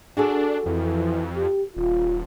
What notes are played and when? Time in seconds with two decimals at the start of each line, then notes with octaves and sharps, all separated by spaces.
0.17 D4 F#4 G#4 A4
0.66 F2 E3
1.36 G4
1.77 D#1 F4